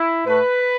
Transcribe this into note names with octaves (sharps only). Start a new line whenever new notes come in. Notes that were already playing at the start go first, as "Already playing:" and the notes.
Already playing: E4
A2 A3 B4